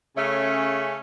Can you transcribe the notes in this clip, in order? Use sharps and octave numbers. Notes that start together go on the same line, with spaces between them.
C#3 A3 C#4